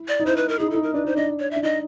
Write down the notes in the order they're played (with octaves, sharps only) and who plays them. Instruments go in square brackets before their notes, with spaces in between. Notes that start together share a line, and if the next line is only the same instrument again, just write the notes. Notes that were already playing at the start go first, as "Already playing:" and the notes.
Already playing: [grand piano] E4
[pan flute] D5
[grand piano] D#4
[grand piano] E4 [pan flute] C5
[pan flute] B4
A#4
[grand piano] D#4 [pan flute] G#4
[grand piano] E4
[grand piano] D#4 [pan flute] A4
[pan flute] A#4
[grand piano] D4 [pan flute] B4
[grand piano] D#4 [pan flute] C5
[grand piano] D4 [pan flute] D#5
[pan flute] C#5
[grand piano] D4 [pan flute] E5
[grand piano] D#4 [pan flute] D#5